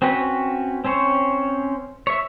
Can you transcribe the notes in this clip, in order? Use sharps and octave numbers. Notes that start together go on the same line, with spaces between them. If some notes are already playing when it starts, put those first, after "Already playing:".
C4 C#4 F#4 B4
C4 C#4 C5 C#5
C#5 E5